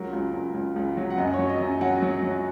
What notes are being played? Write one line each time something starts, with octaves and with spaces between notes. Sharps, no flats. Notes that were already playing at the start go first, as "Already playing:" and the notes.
Already playing: C#2 F#3 A#4
C#2
C#2
C#2
C#2
F#3
F#5
F#2 D#5
C#5
F#3
D#5
F#2
F#3 F#5
F#3
F#3